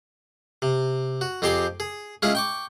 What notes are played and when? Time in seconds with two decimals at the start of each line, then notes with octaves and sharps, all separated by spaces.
0.62 C3
1.21 F#4
1.42 F2 C4 G4 G#4 C6 D6
1.80 G#4
2.22 G#3 C#4 E4 F4 G#4
2.35 G5 C#6 D6